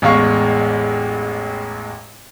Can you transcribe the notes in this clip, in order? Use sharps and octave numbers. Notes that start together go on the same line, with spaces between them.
A1 E2 G#3 F5 C#6